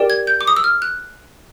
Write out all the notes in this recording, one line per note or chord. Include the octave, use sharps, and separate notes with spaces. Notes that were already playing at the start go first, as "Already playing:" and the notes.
Already playing: G4 A#4 D5 G5
G#6
G6
D6
D#6
E6
F6
F#6